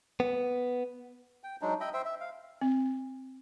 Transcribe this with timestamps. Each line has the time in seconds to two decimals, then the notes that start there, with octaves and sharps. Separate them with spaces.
0.20 B3
1.44 G5
1.62 F#3 G#3 D4 D#4
1.80 D#5 E5 G5 B5
1.93 C5 E5 G5
2.05 E5
2.20 F5
2.61 C4